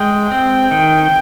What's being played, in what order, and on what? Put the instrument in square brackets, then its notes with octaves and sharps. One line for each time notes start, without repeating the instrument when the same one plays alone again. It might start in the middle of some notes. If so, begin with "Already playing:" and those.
Already playing: [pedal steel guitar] G#3 [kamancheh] G5
[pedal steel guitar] C4 [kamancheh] G5
[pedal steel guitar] D#3